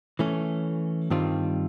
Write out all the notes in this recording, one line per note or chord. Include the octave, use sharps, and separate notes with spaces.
E3 A3 C#4
G2 D#3 G3 C4 F4